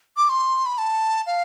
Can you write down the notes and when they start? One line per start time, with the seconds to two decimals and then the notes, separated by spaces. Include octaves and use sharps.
0.17 D6
0.29 C6
0.66 B5
0.78 A5
1.26 F5